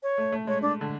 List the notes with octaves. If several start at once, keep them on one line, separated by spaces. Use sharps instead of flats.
C#5
A3
A3
G#3 C#5
D4
D3